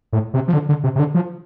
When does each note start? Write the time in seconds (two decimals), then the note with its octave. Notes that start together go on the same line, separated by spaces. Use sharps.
0.13 A2
0.34 C3
0.48 F3
0.53 D3
0.69 D3
0.84 C3
0.95 C3
0.99 D3
1.14 F3